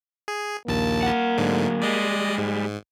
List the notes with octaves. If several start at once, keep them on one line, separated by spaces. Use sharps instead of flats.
G#4
A#1 D#2 A#3 A5
A#4 F#5
D2 G#2 D3 F#3
G3 G#3 D5 D#5
G#2